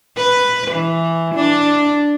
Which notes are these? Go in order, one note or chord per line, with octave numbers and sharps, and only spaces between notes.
B4
E3
D4